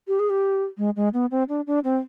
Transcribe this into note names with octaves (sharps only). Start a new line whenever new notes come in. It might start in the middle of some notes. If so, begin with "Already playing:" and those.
G4
G#4
G4
G#3
G#3
B3
C4
D4
D4
C4